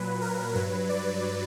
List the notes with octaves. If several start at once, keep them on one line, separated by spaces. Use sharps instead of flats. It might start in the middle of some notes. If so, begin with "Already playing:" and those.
Already playing: A#2 F#3 B4
A#4
G2 F#3 B4
D5